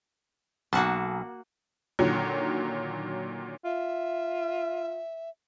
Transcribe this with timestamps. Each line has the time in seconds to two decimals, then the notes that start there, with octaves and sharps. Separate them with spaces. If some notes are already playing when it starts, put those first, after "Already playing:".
0.73 B1 A#3 F#4 A5
1.99 A#2 D3 D#3 F#3
3.64 F4 E5